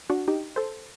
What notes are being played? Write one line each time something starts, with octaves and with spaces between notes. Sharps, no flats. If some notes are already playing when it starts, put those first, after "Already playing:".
D4 F#4
D#4 G4
A4 C5